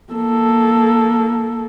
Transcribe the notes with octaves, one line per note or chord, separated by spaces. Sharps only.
A#3 A4